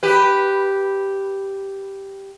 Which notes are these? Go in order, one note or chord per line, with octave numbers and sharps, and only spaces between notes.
G4 B4